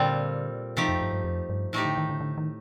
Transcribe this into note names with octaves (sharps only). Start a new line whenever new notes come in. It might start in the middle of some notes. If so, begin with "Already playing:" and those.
Already playing: A#2 D3 G3 C4 F4 A4
C3 F3 A3 D#4 G4
F2
G2
G2
F2
G2
A2 A3 D#4 G4
D3
D#3
D3
D3
D#3